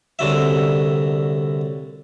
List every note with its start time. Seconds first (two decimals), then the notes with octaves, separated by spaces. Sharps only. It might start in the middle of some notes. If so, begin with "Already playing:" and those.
0.19 C2 D3 F#3 E5